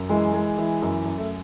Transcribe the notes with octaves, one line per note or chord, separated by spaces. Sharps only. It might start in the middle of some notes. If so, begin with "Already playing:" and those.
Already playing: F#2
E3 G#3
G#3
E3
F#2
F#2
A3